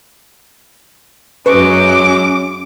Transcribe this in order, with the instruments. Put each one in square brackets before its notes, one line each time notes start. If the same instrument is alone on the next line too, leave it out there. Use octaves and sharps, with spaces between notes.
[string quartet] F#2 F#3 G#3 [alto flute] C#4 [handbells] B4 [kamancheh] D6